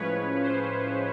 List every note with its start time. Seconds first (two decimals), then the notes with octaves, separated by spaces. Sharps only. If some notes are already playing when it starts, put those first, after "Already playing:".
Already playing: A2 F3 G#3 C#4 B4 C#5
0.42 C5